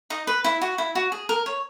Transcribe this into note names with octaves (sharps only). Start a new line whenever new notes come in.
D#4 D#5
B4
E4
F#4
E4
F#4
G#4
A#4
C#5